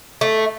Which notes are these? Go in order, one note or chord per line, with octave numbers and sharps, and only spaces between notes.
A3